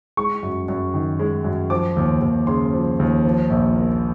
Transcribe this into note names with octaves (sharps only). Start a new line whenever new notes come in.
G#3 C#6
F#2
F#2
D#3
G#3
F#2
F3 D6
D#2
D#2
C#3 C6
F3
D#2
F3
A#1
A#3